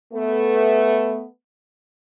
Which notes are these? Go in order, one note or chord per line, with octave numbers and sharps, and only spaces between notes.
A3 B3